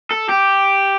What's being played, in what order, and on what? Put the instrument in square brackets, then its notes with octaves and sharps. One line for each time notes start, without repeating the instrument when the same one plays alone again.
[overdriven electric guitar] A4
G4